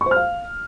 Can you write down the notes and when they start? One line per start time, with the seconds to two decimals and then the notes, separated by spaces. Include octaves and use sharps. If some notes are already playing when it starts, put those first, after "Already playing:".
0.01 C#6
0.06 C5
0.11 F6
0.16 F5